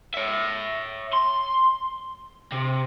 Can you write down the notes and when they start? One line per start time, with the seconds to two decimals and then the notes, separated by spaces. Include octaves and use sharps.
0.14 C#5 E5
1.13 C6
2.52 C3